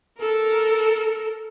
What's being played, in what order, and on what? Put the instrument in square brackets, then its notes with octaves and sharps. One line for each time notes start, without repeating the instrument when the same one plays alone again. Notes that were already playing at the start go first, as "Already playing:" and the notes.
[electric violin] A4 A#4